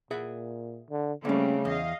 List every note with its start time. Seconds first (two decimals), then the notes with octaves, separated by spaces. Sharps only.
0.11 A#2 G#4 E5 F#5
0.90 D3
1.25 C#3 G3 A3 A#3 C4 C#4
1.65 E2 D#5 F5